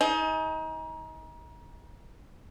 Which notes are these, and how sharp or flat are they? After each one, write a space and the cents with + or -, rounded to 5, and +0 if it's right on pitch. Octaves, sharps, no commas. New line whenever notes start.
D#4 +30 G#4 +40